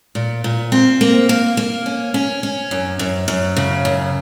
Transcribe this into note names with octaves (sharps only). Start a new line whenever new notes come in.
A#2
A#2
C4
A#3
A#3
A#3
C#4
C#4
C#4
F#2
F#2
F#2
C#3
F#2